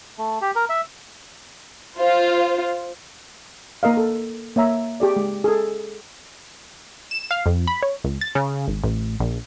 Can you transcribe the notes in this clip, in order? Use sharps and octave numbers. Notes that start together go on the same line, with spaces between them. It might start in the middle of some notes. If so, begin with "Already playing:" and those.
A3
G4
A#4
E5
F4 C5
A#3 A#4 D#5 F5
A4
A#3 C#5 E5 A#5
G4 G#4 D5
G#3
G#4 A4
E7
F5
F2
B5
C#5
C#2
A6
C#3
G#1
A1
A#1